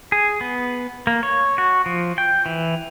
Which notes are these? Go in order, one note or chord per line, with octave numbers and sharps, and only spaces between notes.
G#4
B3
A#3
C#5
F#4
F3
G5
E3